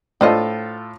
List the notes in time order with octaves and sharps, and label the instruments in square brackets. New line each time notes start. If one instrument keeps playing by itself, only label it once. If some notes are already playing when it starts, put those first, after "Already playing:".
[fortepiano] A2 F4 A4 [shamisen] D4 C5 D#5